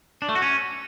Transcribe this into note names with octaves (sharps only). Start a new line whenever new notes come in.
D4
A3
F#4
C#4